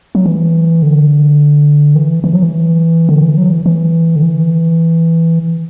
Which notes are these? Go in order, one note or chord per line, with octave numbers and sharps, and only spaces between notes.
F#3
E3
D3
E3
E3
F#3
E3
D3
E3
F#3
E3
E3
D3
E3